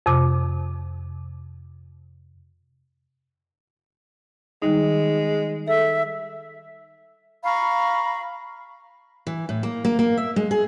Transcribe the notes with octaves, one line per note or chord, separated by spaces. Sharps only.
F2 C3 D6
D#3 G3 G#3 D#4
A4 E5
F5 A#5 B5 C#6
E3
A2
A#3
A#3
A#3
E5
G#3
G#4